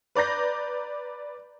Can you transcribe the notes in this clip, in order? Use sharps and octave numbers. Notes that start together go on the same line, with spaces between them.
B4 D5 A#5 G6 A#6